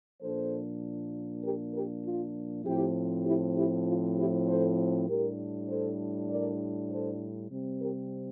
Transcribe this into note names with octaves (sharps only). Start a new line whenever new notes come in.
A#2 F3 A#3 D4 A4 C5
G4 A#4
G4 A#4
F4
A2 F3 C4 E4 G4
E4 G4
E4 G4
F4
E4 G4
A4 C5
A2 G3 D4 G4 A#4
A4 C5
A#4 D5
A4 C5
C3 G3 C4
G4 A#4